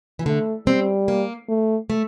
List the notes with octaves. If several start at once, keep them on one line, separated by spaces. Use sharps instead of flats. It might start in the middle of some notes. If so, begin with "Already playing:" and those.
E3
D3 A3
G3 C4
A#3
A3
A3